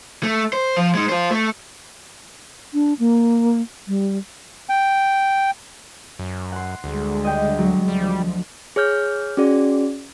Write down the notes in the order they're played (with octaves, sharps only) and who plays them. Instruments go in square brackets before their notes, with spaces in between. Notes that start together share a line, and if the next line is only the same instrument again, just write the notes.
[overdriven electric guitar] A3
C5
F3
G#3 D#4
F4 C5
A3
[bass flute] D4
A#3
G3
[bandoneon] G5
[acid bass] F#2
[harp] F#5 C6
[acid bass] D2 [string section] D3 G3 G#3
[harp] D#5 G5
F#3
[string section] D2 F3 [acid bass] G3
[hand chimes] G#4 C#5 F6 G6
C#4 F#4 G#4 D5